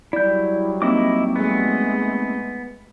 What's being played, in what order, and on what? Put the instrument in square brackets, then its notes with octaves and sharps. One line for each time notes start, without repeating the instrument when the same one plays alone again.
[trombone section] F#3 G3 [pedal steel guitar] E4 G6 [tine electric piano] D5
[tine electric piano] A#3 C4 D#4 [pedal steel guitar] E4 D#5 D6
[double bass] G#3 A3 [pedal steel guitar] B3